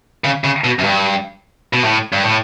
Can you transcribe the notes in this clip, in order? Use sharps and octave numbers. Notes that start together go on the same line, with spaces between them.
C#3
C#3
B2
F#2
G2
B2
A2
G2
A2